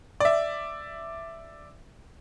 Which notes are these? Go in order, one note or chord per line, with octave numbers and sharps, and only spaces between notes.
D5 E5